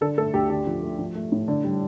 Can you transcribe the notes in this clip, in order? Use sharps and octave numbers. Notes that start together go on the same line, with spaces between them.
D3 A4
A3 A4
D2 G4
D3 G4
F3
A3
F3
A3
A2
D3
G3